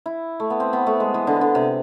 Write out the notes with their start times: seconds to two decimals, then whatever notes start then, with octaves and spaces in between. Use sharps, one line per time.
0.06 E4
0.40 A3
0.50 B3
0.60 C4
0.73 B3
0.87 A3
1.00 G#3
1.14 E3
1.27 D3
1.41 D3
1.55 C3